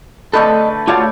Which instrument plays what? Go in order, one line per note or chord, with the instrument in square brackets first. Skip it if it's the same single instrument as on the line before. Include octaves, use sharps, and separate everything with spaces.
[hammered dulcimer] D3 A3 B4 [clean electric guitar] A4 D#5
[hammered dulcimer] A3 C#5 D5 [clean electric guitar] F4 F#4 F5